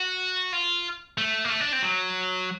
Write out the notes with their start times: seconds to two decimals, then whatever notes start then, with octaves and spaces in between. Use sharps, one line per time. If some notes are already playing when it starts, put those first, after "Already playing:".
Already playing: F#4
0.53 F4
1.18 A3
1.44 A#3
1.50 A3
1.61 D4
1.73 C4
1.82 F#3